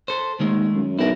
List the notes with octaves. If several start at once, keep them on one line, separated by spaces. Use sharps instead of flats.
A4 C5
D#2 D#3 G#3 A3
F#2
B1 E4 A#4